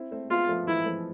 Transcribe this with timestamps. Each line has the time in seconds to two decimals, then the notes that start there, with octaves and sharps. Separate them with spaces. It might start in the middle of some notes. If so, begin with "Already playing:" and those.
Already playing: C4 E4
0.11 A3 C4
0.30 G#3 B3 F4
0.49 F3 A3
0.67 E3 G#3 E4
0.86 F3 A3